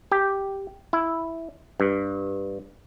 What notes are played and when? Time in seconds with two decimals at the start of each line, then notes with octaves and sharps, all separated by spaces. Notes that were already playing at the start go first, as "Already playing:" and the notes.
0.12 G4
0.93 E4
1.80 G2